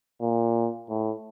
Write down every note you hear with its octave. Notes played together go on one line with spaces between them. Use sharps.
A#2
A2